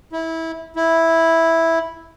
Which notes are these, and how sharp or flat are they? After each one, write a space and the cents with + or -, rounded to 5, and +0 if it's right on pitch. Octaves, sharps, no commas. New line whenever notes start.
E4 -20
E4 -5